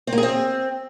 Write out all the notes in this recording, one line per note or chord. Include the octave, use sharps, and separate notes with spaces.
C4
A#3
G#4
C4